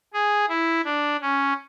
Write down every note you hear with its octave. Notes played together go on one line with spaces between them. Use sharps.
G#4
E4
D4
C#4